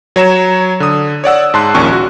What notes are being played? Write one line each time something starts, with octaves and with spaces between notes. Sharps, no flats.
F#3 C#5 A#5 E7
D3 D#6
C#5 D5 F#5 E6
G#2 A5 C6 F#6
A#1 D#2 A#2 C#4 C#6
F#4